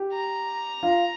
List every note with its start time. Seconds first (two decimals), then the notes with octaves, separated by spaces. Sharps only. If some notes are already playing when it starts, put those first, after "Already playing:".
Already playing: G4
0.13 A#5
0.83 F4